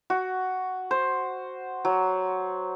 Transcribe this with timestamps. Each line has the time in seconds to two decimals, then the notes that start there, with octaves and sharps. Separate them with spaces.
0.10 F#4
0.91 C5
1.85 F#3